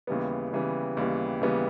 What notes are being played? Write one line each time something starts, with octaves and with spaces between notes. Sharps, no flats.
D#2 C#3 E3 G3 B3
D#2 C#3 E3 G3 B3
D#2 C#3 E3 G3 B3
D#2 C#3 E3 G3 B3